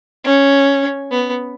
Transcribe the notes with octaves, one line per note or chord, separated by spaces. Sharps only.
C#4
B3